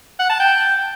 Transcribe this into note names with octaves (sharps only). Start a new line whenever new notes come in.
F#5
A5
G5